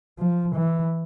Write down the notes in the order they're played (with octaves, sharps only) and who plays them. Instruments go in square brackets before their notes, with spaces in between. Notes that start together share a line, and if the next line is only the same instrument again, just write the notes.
[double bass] F3
E3